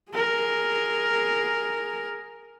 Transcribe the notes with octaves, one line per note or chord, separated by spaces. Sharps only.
G#4 A#4